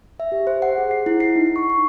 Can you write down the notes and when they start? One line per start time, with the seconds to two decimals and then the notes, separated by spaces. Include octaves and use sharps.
0.20 E5
0.32 G4
0.47 C5
0.62 F#5
0.78 G#4
0.91 C7
1.06 E4
1.20 C7
1.36 D#4
1.56 C#6
1.70 C#6